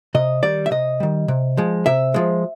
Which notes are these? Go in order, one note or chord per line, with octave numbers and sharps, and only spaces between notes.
C3 D#5
D#3 G3 D5
E5
C3 D#5
D#3 G3
C3
F3 G#3
C3 E5
F3 G#3